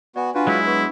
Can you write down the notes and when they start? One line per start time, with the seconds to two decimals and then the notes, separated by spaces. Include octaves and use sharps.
0.16 B3 F#4 D5 G#5
0.35 D4 F4 F#4 B4 G#5 A5
0.47 F#3 G#3 E4
0.66 B3 B4 C#6